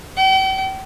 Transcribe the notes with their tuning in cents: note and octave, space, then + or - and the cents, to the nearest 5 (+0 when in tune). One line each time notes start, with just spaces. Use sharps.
G5 -40